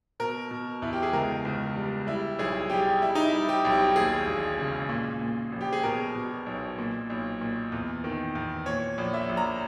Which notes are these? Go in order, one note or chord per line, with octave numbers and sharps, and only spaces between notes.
B2 A#4
B2
E2 E4
G4
G#4
C#2 A#4
C#2
G3
G3 E4
B1 G#4
G3 G4
G3 E4
D#4
E4
G3
G4
B1
G4
D#2 G#4
E1
C#3
A#2
A#2
A#1
G4
G#4
B2 A#4
B2
B1
A#2
B1
A#2
E2
D#3
E2
A#2 C#5
A#1
E5
A#1
A#5